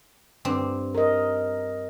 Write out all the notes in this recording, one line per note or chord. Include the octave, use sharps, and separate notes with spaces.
G2 C4
A#4 D#5